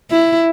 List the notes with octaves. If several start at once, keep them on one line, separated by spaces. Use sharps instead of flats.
E4